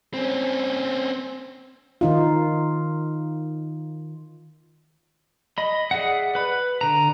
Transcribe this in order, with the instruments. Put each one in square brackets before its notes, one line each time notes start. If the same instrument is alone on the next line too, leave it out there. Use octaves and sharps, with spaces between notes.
[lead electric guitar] C4 C#4
[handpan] D#3 D#4 F4
[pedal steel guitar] D#5 B5
G#4 D5 E5 F#5
B4 B5
D3 A#5